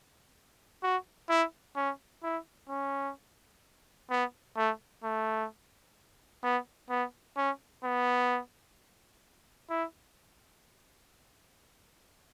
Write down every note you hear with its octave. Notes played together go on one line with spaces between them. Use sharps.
F#4
E4
C#4
E4
C#4
B3
A3
A3
B3
B3
C#4
B3
E4